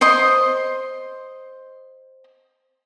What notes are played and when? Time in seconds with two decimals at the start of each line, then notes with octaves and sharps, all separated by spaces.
0.01 C5 D#5 C6